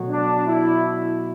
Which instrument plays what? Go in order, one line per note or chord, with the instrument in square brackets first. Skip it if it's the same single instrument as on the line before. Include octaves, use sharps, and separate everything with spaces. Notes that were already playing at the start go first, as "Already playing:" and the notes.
Already playing: [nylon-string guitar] B2 F#3 A3
[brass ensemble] D4
E4